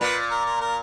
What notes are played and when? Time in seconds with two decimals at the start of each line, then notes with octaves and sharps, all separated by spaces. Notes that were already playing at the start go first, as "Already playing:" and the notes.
0.01 A#2 B4
0.31 A#4
0.46 A#4
0.61 A#4